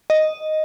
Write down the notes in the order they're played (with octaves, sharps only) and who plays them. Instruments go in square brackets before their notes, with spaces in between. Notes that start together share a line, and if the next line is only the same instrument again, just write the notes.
[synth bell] D#5